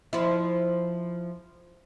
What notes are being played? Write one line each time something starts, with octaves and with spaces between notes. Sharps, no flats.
F3 E4